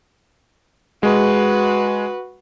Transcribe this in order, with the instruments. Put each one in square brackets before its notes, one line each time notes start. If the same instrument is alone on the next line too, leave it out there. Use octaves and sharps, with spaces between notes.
[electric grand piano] G#3 [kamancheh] F#4 B4